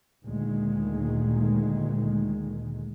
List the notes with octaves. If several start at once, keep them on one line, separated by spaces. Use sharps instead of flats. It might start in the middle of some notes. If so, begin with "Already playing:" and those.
D2 A#2 D#3 G#3